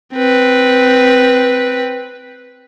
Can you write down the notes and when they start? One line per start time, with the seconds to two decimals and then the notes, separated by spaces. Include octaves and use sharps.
0.14 C4 B4